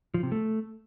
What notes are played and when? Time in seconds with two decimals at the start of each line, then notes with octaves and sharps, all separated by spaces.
0.14 F3
0.23 C3
0.32 A3